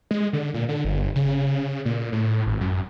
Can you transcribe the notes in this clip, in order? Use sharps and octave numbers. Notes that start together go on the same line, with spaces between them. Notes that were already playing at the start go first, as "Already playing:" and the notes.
G#3
D3
A#2
D3
G1
C#3
A#2
A2
G#1
F#2